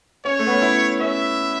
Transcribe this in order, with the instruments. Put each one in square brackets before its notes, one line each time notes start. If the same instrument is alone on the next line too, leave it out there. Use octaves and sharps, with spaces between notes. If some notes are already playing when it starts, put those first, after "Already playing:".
[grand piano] C#4 [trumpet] C#5
[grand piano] A3
B3
C#4
E4
[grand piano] C#4 [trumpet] E5